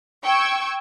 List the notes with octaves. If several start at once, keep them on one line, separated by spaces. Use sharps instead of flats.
G5 C#6 E6 G#6